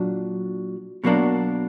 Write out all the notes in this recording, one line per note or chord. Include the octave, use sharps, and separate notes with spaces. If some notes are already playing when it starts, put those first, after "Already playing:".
Already playing: A#2 F#3 D4
B2 F#3 A#3 D4